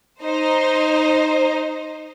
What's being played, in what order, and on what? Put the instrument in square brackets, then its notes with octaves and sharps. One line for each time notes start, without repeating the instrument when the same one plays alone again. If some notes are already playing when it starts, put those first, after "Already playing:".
[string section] D#4 C5